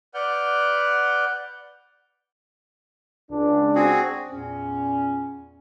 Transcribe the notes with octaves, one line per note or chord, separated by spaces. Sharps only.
B4 D5 F#5 F6 G6
C#2 D4
C4 F#4 G#4
E2 A#2 C#4